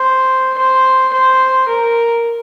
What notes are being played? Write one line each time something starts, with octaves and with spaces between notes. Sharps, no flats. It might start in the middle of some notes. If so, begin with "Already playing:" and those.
Already playing: C5
C5
C5
A#4